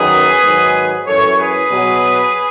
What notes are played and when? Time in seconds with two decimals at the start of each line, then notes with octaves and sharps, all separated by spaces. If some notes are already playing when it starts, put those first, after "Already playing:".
Already playing: F#2 D#3 F#3 G#4 B4
0.43 G#2 D#3 F#3
1.06 F#2 E3 A4 C#5
1.39 G#4 B4
1.71 B2 F#3